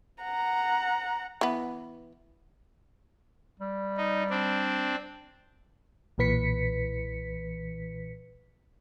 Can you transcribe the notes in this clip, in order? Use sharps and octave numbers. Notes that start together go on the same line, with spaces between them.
F#5 A#5
E3 B3
G3
D#4
C4 D4
B1 A#2 E3 B4 B6 C#7